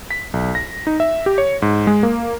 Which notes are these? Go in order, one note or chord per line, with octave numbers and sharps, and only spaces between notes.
B6
B1
A#6
D#4
E5
G4
C#5
G#2
G#3
A#3